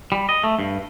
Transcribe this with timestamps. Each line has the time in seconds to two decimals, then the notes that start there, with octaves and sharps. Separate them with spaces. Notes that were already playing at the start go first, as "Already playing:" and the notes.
0.12 G3
0.29 D#5
0.44 A3
0.59 G2